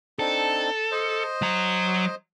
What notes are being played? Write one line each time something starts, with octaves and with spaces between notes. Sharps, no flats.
C4 D4 D#4 A4
C5 D#5
F#3 A#5